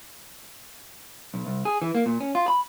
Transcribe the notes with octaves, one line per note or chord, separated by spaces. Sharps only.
B1
C2
G#4
E3
A#3
A#2
C#4
F4
B5